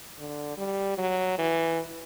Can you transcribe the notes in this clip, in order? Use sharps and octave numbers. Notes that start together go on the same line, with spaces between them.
D3
G3
F#3
E3